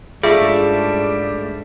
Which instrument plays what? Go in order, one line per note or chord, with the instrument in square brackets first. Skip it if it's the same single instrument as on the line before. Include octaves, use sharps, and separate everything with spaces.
[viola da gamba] G#2 D4 [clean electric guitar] G3 A3 [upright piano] F4 E5 [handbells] G#4